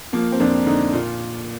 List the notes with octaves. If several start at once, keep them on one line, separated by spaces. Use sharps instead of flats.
F3 A#3
C4
F2 D4
D3 D#4
A#2 F4